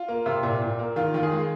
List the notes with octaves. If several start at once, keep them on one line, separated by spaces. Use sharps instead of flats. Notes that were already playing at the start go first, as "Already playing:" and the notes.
Already playing: F4
A#3
C3
A#2
A#2
A#3
D#3 F4
D#3 F4
G#4
G#3